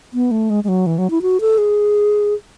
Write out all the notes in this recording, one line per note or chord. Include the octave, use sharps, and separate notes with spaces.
B3
A3
G#3
G#3
F#3
E3
F#3
E4
F#4
A4
G#4